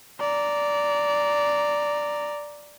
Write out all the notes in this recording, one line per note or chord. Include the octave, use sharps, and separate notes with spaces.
D5 A#5